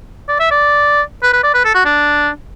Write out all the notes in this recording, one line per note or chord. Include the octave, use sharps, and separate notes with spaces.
D5
E5
D5
B4
B4
D5
B4
A4
F#4
D4